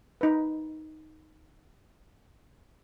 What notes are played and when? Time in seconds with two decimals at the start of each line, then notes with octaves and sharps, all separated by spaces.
0.21 D#4 B4